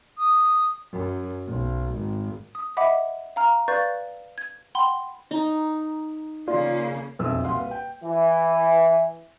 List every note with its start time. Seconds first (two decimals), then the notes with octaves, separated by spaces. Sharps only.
0.18 D#6
0.92 F#2
1.47 B1
1.95 G#1
2.55 D#6
2.77 D#5 E5 F#5 B5 D6
3.36 F5 A#5 F6
3.68 B4 D5 F5 C#6 G6 A6
4.38 G#6
4.75 F#5 G5 B5 C6 G7
5.31 D#4 E4 A#5
6.48 C#3 A#3 F4 D5
7.19 E1 B1 F2 E5 E6
7.44 C2 A#2 F5 F#5 C6
7.59 B4
7.71 G5
8.04 E3